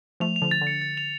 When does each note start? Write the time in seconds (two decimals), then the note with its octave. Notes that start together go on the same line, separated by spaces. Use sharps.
0.20 F3 A3 F7
0.36 F7
0.42 D3 F3
0.51 A6
0.61 D3
0.67 C#7
0.82 A6
0.97 F7